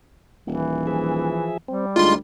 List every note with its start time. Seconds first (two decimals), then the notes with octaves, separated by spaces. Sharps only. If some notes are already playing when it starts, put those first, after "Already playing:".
0.47 D#1 E3
0.87 F3 G#4 E5
1.68 G3 C4
1.96 D2 G#3 D#4 F4 C6